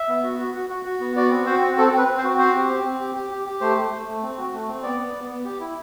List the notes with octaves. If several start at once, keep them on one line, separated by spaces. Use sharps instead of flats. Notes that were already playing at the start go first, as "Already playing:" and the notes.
Already playing: E5
B3
F#4
F#4
F#4
F#4
F#4
B3
F#4 D5
C4
F#4 C5
C4
C4 A4
C4 B4
C4
C5
F#4
C4 C5
G4
C4
C4
G4
G4
G4
G4
A3 C5
A3
A3
A3
C4
F#4
A3
C4
B3 D5
B3
B3
B3
G4
E4